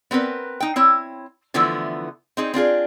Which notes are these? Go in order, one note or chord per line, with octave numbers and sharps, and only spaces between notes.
B3 C4 A#4 B4
D#4 G5
C4 E4 C#5
D3 E3 F3 A3 B3 E4
C4 D#4 G#4
C4 D4 F4 G#4